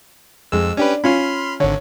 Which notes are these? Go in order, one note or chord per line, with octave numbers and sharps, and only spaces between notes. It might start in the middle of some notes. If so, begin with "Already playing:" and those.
F2 G#3 E6
C#4 D4 G4 B4
C#4 F4 B5 C6 F6
G#1 D3 C#5